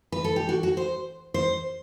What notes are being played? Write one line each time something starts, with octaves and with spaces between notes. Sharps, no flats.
B4
A4
G4
F#4
F#4
C5
C5